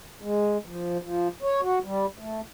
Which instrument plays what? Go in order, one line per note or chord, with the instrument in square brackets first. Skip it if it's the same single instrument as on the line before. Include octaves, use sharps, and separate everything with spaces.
[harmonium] G#3
F3
F3
C#5
F#4
G3
A3